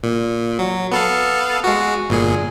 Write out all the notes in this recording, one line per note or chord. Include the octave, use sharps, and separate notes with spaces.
A#2
F#3
B3 A4 F5
G#3 F#4
G1 A#2 G#4